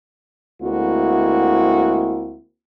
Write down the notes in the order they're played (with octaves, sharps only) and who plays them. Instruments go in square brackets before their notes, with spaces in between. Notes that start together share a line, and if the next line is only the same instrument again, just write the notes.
[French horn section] D2 G#3 A#3 C4 E4 F#4